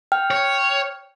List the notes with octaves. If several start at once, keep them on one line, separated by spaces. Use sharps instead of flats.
G5 F6
C#5